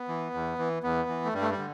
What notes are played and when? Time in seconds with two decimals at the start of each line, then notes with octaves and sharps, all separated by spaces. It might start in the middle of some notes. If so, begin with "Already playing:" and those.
Already playing: B3
0.08 E3
0.34 E2
0.59 E3
0.83 E2 B3
1.09 E3
1.25 A3
1.34 G2 G3
1.42 A3
1.51 G3
1.59 D3